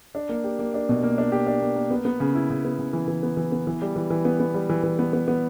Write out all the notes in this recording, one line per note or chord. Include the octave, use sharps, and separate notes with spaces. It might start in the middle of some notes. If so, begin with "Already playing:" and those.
D4
A#3
G4
A#3
D4
B2
A#3
D4
G4
D4
A#3
A#3
B3
B3
C#3
E4
C#3
B3
C#3
E3
E3
B3
E3
B3
E3
G3
E3
E3
B3
B3
G3
E3
E3
B3
B3
B3